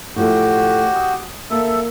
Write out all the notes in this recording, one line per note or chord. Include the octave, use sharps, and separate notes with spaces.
A2 F3 A3 F#4 G4
D#6
A#3 A4 E5